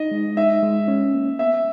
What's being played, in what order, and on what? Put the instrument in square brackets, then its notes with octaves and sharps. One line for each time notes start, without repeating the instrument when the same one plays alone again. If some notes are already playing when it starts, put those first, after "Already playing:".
Already playing: [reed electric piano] D#4 [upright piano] D#5
[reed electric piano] G#3
[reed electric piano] D#4 [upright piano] E5
[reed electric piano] G#3
C#4
A#3
[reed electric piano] B3 [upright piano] E5